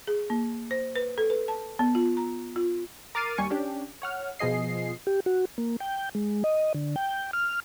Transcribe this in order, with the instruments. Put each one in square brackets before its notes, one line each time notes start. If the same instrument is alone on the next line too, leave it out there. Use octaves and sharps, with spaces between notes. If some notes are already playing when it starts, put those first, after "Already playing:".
[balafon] G#4
A#3
C5
B4
A4
B4
A5
B3
F4
A#5
F4
[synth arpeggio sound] A#4 D6 F6 A6 C7 D#7
D#2 G3 G#5 C#6
C#4 D4 G4
C#5 F#5 F6
B2 F3 G#4 D#5 C7
[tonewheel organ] G4
F#4
A#3
G5
G#3
D#5
D3
G5
F6